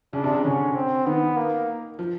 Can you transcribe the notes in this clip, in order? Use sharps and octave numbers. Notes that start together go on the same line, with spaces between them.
C#3 D4
C3
C#3
D3 C#4
C4
D#3 B3
A#3
F3